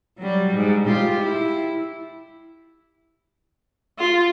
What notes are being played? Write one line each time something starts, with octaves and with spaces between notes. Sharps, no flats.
F#3 G3
G#2
F4 G4
E4
F4